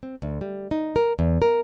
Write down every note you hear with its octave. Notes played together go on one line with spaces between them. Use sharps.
C4
D2
G3
D#4
A#4
E2
A#4